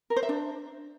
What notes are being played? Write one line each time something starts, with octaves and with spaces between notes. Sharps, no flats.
A#4
C5
E5
D4